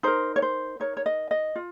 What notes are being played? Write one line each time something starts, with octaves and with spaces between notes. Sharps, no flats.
D#4 A#4 C5
C#5
C5
D#4 A#4 C#5
C#5
D#5
D#5
F4